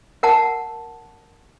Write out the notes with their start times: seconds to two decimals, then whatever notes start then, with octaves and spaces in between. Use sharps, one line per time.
0.23 A#4 F#5 A5